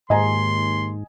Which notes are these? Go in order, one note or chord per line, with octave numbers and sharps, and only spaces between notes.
D#2 G#2 D#5 G#5 A#5 C6